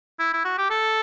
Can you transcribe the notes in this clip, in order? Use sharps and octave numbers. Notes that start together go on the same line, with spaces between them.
E4
E4
F#4
G4
A4